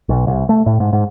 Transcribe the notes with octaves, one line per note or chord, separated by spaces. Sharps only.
B1
C2
A3
A2
G#2
G#2